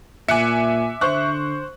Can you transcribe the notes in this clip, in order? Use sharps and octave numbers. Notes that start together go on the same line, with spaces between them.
A#2 E5 G#5 D6 F#6 C#7
D3 C5 C#6 F#6